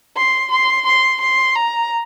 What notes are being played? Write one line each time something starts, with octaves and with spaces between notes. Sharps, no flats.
C6
C6
C6
C6
A#5